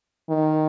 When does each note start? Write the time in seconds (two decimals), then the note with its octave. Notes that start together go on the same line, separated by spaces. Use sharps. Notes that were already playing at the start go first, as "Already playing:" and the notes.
0.29 D#3